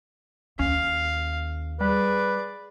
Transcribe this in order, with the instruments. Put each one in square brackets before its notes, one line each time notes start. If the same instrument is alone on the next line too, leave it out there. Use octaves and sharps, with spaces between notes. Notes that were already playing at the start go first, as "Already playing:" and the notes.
[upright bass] D#2 [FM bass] C#4 [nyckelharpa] F5
[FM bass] G3 [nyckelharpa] G#4 D5 [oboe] B4